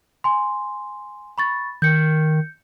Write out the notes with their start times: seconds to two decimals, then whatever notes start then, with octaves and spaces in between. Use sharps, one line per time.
0.24 G#5 C6
1.38 B5 C#6 A6
1.82 D#3 G6 C#7